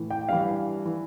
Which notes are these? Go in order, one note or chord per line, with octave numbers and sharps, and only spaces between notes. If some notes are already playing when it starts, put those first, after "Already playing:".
Already playing: A2 E3
G5
G2 E3 F5
E3